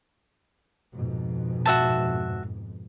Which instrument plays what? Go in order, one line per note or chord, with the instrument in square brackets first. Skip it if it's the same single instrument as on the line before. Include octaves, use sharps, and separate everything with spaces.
[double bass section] F2 G#2 B2
[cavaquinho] F#4 E5 A5